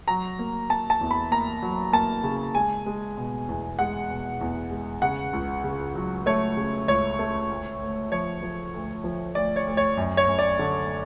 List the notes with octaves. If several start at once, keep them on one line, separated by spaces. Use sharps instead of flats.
F#3 A#5
A#3
A#3 A5
A5
E2
B5
A#3 A#5
F#3
A#3 A5
C#3
G#3 G#5
G#3
B2
E2
G#3 F#5
B2
E2
G#3
C#3 F#5
C#2
C#3
F#3
A3 C#5
C#3
C#2 C#5
A3
D2
D2
F3 C#5
F3
D2
F3
D2 D5
C#5
D2
C#5
F#2
C#5
F#2
D5
D3